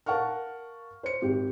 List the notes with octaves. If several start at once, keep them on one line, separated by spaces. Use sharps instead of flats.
A#4 F5 F#5 A5 C#6 F6
C5 C#7
G#1 G4